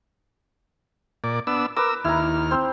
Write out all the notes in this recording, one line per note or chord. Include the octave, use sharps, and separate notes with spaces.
A#2 D5
B3 D4 E6
A#4 B4 D6 E6
D#2 E4 A#5 F6
C4 C5